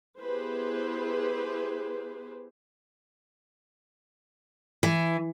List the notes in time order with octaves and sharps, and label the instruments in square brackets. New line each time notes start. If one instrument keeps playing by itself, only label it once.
[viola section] B3 E4 G4 G#4 B4 C5
[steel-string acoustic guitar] E3